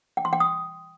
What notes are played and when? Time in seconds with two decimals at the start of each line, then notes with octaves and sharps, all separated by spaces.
0.17 G5
0.25 C6
0.33 G5
0.40 D#6